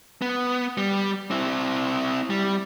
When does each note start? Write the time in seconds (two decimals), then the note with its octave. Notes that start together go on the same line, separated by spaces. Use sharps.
0.22 B3
0.78 G3
1.31 C4 E4
2.30 G3